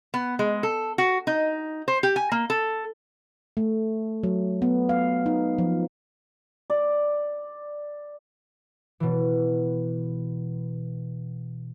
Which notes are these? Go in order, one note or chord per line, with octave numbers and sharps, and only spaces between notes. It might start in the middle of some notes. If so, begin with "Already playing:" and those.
B3
G#3
A4
F#4
D#4
C5
G4
G#5
A#3
A4
A3
F#3
B3
F5
D#4
F3
D5
B2 E3